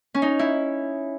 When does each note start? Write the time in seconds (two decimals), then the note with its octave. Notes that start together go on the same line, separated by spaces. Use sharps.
0.14 C#4
0.22 D#4
0.39 E4